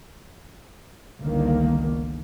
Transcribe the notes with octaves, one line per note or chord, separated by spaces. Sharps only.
G1 C#2 D3 D#3 A#3